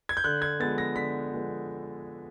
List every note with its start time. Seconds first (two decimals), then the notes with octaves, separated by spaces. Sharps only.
0.09 G#6
0.17 G6
0.24 D3 F#6
0.42 G#6
0.60 F3 G#3 B3 A6
0.78 A#6
0.96 D3 B6
1.32 F3 G#3 B3